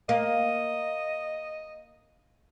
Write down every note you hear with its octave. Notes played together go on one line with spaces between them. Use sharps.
A#3 D#5